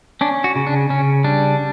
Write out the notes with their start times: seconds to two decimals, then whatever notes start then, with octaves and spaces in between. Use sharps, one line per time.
0.21 C#4 D4
0.44 F#4
0.56 C#3
0.67 D4
0.89 C#3 C#4
1.24 G3 D4